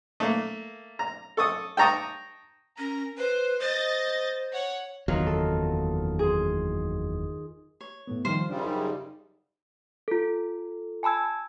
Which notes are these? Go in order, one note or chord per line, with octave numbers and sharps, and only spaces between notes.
A3 A#3
A#5
A4 C#6 D#6
G5 A5 A#5 C#6 D#6
C#4 A#4 A#5
B4 C5
C5 D#5 A6
C#5 F#5
F#1 E2 D#3 F#3 F4
A4
G#4 C6
C#5
A2 A3 B3
D#3 F3 G3 F4 C5
F#2 C#3 G3 D4
D#4 G4 D5
F4 A4
G#5 A5 B5 E6 G#6